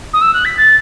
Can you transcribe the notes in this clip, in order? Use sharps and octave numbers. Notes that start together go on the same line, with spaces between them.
D#6
E6
F#6
B6
A6